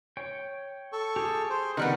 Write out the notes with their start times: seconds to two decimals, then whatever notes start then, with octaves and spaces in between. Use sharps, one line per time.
0.17 C#5 G5
0.92 A4 C#6
1.16 G4 G#4
1.50 C5
1.77 D#3 G3 B3 A#4 F#5 F#6